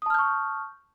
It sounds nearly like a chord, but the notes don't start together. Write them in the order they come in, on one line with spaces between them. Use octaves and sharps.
D#6 A5 F6 G6 C#6